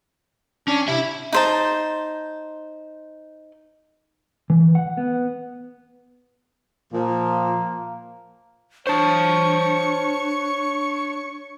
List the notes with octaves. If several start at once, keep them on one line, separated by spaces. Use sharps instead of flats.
C#4 D4
C3 E4 E5
D#4 C5 A5
E3
F#5
B3
A#2 F3 A#3
D4 C5 C#5 A5 C#6